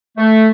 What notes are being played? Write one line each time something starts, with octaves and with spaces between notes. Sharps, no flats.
A3